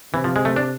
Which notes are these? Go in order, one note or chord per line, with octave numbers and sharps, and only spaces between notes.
C3 E3
F3
G#3
A3
D4